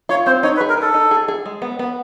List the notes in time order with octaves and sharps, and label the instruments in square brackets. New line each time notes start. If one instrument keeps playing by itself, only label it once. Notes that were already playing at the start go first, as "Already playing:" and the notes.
[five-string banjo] F4 [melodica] C#5
[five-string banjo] C4 [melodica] C5
[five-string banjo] D#4 [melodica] C#5
[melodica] B4
[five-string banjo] G#4
[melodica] A#4
[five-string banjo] D#4 [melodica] A4
[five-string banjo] D#4
G#4
G#4
G#3
B3
B3